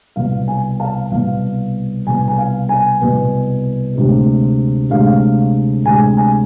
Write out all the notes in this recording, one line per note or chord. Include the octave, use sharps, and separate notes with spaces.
C2 B2 B3 F5
G#5
F5 A5
C2 B2 B3 F5
C2 B2 B3 G#5
G#5
F5
G#5
C2 B2 B3
D2 C3 G#3
D2 C3 G#3 F5
D2 C3 G#3 G#5
G#5